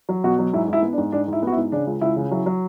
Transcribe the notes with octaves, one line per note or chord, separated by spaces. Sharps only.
F#3
B2 F#4
F#3
G#2 E4
G#2 E4
B3
D4
G#2
G#2 D4
G#2 E4
B3 F#4
E4
G#2
C#3 D4
C#2
C#2 E4
C#3
F#3 E4
F#3